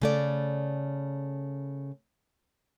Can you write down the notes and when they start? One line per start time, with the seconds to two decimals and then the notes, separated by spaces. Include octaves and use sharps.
0.01 C#3 A3 D5